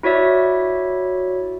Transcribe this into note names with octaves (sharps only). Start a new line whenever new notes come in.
E4 F#4 C#5 D5 E5